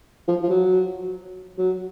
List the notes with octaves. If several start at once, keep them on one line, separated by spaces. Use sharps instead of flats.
F3
F3
F#3
F#3